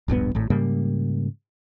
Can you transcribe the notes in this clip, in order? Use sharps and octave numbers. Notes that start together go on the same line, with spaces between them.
D1 A#1 G2 B3
G#1 A2
G#2 C#3 G3 A#3